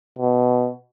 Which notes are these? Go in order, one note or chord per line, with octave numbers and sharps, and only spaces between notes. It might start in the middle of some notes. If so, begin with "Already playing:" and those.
B2